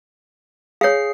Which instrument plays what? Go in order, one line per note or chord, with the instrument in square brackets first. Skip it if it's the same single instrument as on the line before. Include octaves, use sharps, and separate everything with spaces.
[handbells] G#4 C7 [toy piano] C#5 F5